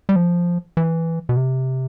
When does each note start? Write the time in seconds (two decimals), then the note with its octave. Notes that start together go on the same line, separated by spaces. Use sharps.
0.09 G3
0.16 F3
0.77 E3
1.29 B2
1.37 C3